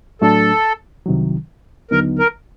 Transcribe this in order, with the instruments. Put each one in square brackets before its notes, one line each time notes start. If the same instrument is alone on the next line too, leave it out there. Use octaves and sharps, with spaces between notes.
[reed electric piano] A2 F#3 A3 D4 [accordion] A4
[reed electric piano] C2 C3 D#3 F#3
[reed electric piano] D#2 D3 F#3 B3 D#4 [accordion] A#4
[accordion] A#4